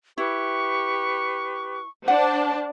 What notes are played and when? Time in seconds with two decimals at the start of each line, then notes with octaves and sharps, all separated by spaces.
0.18 E4 G4 B4 C#6
2.08 D4 C5 F#5 A5